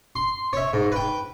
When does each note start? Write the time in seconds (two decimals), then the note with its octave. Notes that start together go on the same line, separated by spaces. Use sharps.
0.16 C6
0.53 C#5 E5
0.73 G#2
0.92 B4 G5